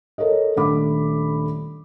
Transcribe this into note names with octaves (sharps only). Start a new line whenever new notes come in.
A4 A#4 C#5 D#5
D#1 A3 D4 B5 D6